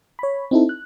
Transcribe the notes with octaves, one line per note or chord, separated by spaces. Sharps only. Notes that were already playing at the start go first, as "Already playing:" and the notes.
C#5 B5
C4 D#4 E4 A4
F#6